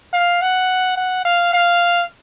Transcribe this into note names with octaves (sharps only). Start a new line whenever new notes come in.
F5
F#5
F#5
F5
F5